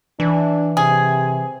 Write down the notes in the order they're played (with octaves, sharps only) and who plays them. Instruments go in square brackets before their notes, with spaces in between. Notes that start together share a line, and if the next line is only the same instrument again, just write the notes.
[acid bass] E3 [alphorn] D4
[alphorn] C3 [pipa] G#4